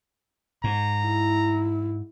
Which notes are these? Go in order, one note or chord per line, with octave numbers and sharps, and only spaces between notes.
G#2 A#5
E4